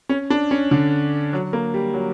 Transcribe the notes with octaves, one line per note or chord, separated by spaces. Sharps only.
C#4
D4
C#4
D3
F#3
A#3
G3
F#3